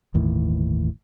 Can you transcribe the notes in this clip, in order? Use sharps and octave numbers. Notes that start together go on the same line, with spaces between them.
G1 D#2 A2 E3